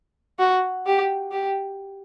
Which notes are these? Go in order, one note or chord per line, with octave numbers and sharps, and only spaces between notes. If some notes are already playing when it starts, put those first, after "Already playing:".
F#4
G4
G4